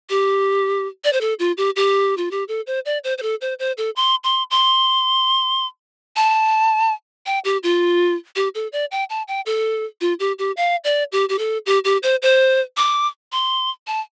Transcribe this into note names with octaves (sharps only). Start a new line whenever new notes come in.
G4
D5
C5
A4
F4
G4
G4
F4
G4
A4
C5
D5
C5
C5
A4
C5
C5
A4
C6
C6
C6
A5
G5
G4
F4
G4
A4
D5
G5
A5
G5
A4
F4
G4
G4
F5
D5
G4
G4
A4
G4
G4
C5
C5
D6
C6
A5